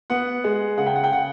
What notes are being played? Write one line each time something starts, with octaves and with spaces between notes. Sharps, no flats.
B3 F#5
G#3
C#3 F#5
G5
F#5
G5
C#3 F#5